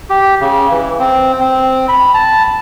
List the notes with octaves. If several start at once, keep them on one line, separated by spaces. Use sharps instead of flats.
G4
C#3
E3
C4
C4
B5
A5